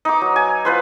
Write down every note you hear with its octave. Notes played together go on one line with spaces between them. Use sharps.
D#4 D6
F#3
G#5
F4 B4 C5